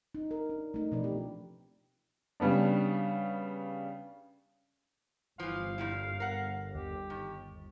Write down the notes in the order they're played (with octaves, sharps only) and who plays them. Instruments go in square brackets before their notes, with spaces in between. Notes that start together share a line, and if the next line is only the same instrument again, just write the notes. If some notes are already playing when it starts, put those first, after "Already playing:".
[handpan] D#4
A#4
D4
A3 D#4
B2 E3 F3 D4 B4 D5
C4 G4
[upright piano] C#3 G3 B3 D4
[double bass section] G1 [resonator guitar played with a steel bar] E3 F3 [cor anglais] F5
[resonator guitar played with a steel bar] A#2 G3 E4
A#4 F#5
[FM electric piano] D#2 [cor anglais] G4
[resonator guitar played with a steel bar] D#3